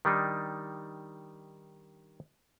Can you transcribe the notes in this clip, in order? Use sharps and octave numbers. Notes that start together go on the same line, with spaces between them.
D#3 G3 D4 D#4